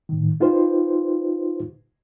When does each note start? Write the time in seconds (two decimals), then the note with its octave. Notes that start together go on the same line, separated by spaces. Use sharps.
0.09 A2 D#3
0.40 D#4 F4 G4 B4 C5